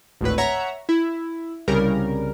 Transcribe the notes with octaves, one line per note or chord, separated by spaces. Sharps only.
G#1 D2 A2 B4
C#5 E5 F#5 A#5
E4
C2 C#3 G3 A#4